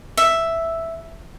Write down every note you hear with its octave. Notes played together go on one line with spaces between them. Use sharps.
E5